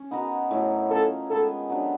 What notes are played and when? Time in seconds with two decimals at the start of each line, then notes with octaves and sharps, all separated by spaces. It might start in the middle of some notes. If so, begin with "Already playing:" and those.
Already playing: C#4
0.11 B3 D#4 F#4 A#4
0.51 A2 F#3 A3
0.90 A3 C#4 F4 A4 A#4
1.30 D#3 G#3 B3 A4
1.70 F#3 B3 D4 G4